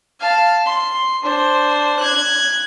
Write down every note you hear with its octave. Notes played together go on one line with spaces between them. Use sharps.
F5 A5
C6
D4 C5
F#6 G#6